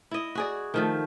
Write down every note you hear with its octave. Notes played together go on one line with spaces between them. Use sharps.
E4 D#5
F#4 G#4 D5
D#3 F3 A3